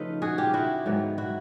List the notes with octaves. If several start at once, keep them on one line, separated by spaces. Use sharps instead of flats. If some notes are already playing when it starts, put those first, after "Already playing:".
Already playing: C#3 F3 A3 D#4 F4 A4 B4
F#4 G#4
F4 G4
E4 F#4
G#2 D#3 F#3 B3
E4 F#4